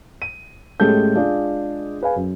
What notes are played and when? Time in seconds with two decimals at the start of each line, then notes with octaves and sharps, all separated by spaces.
0.22 D#7
0.80 A2 G#3 C#4 G4 A4 G6
1.15 G#3 D4 F4 G#4
2.01 G#4 B4 F5 G#5
2.16 F#2